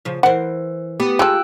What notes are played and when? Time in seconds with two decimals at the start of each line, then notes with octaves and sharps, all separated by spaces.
0.05 C#3 F3
0.23 E3 A#4 C5 F#5
1.00 B3 G4
1.19 G#3 F4 A4 G5 E6 F#6